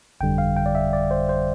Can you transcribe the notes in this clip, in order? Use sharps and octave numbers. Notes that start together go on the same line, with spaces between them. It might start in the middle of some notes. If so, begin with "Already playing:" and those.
G1 F2 D3 G3 G5
F5
G5
D5
E5
D5
C5
C5